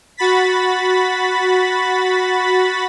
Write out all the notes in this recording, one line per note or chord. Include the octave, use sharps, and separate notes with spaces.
F#4 B5 A6 B6